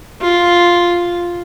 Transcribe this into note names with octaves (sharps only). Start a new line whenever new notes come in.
F4